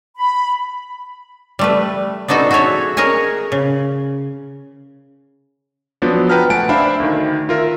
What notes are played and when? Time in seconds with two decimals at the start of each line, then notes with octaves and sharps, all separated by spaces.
0.16 B5
1.59 G3 A3 B4
2.28 B3 D4 D#4 F#4 A4
2.51 F#4 G#4 A4 C#5 E5
2.97 G#4 A#4 C#5 D#5 F#5 G#5
3.52 C#3
6.02 F3 F#3 B3 D4
6.29 B4 F#5 G5 A5 A#5 F6
6.50 A3 F#5 G#5 A5 D7
6.69 D4 C5 E5 F5 B5
7.00 D2 D#3
7.49 F4 A#4 E5